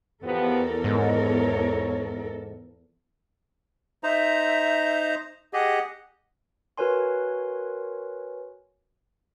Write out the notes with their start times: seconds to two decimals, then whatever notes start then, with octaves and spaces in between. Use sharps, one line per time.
0.24 E2 F3 B3 G4 A4 A#4
0.84 G#2 C#5
4.03 D#4 C5 E5 A#5
5.53 G4 G#4 D#5 F#5
6.78 F#4 A#4 B4 C#5 G#5 C6